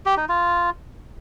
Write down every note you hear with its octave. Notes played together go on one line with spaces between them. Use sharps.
G4
D#4
F4